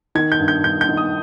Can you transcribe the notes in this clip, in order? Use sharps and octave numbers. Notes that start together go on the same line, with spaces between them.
D#3 G#6
G6
G2
G6
G2 G6
G6
D#3
D#6